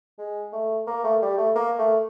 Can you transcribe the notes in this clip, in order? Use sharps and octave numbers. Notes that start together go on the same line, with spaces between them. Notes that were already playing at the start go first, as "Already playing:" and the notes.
G#3
A3
A#3
A3
G3
A3
A#3
A3